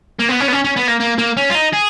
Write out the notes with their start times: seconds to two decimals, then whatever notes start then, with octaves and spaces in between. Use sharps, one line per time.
0.19 A#3
0.29 B3
0.40 C#4
0.48 B3
0.53 C#4
0.65 C#4
0.77 B3
0.88 A#3
1.00 A#3
1.19 A#3
1.37 C#4
1.50 F4
1.55 D#4
1.73 G#4